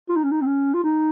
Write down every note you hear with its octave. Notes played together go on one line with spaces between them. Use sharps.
F4
D#4
C#4
D#4
C4
C#4
F4
D#4